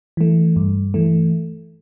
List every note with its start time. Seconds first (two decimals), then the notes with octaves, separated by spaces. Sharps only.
0.17 E3 A3
0.56 G2
0.94 E3 A3